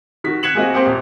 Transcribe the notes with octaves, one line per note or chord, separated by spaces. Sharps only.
D#3 F#4 B6
F#6 G#6 B6 C#7 E7 F#7
G#3 A#3 C4 F#4 D#5
A#3 C4 G4 C5
D#1